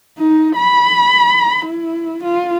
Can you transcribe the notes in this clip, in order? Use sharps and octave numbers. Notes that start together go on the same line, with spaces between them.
D#4
B5
E4
F4